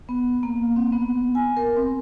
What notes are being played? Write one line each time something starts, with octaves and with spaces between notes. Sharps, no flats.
B3
A#3
C4
B3
G#5
A#4
C4